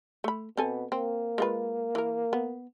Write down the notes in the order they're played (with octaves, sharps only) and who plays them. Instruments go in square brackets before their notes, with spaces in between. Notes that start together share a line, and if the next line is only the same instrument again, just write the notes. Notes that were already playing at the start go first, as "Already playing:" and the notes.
[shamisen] A3 B5
[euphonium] B2 [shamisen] C4 A4 G#5
[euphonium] A#3 [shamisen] C4
[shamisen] G#3 F4 B4
E3 A#4
B3